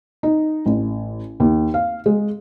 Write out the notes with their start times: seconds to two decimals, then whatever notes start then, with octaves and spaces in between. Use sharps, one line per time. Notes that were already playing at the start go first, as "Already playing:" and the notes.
0.23 D#4
0.66 A1
1.40 D#2
1.74 F5
2.06 G#3